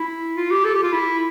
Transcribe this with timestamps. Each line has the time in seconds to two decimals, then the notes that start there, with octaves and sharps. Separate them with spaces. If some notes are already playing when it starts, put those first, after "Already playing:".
Already playing: E4
0.37 F4
0.51 G4
0.65 A4
0.74 G4
0.83 F4
0.92 E4